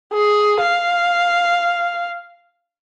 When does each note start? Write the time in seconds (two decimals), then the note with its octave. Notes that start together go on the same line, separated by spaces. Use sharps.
0.13 G#4
0.60 F5